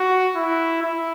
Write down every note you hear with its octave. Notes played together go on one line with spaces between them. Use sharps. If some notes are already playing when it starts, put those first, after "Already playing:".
Already playing: F#4
E4
E4